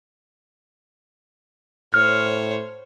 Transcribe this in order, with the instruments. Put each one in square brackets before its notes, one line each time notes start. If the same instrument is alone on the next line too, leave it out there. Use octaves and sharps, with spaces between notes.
[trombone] A2 [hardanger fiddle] C5 C#5 [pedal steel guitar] F6